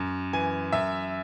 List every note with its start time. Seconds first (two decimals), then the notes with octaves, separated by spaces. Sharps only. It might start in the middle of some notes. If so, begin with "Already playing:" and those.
Already playing: F#2
0.33 E3 G#5
0.72 F#2 E5